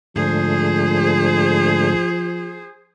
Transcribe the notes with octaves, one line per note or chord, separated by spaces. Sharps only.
G#2 D3 F3 A3 G#4 C5